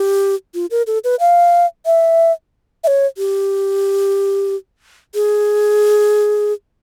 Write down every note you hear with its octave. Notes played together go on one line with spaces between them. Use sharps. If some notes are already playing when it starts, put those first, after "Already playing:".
Already playing: G4
F4
A#4
A4
B4
F5
E5
E5
C#5
G4
G#4